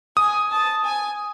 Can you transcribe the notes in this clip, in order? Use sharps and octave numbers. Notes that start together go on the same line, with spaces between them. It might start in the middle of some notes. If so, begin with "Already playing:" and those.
G#5 D#6
A5
G#5